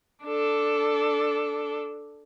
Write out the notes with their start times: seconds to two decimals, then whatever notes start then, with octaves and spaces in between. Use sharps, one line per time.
0.23 D4 A4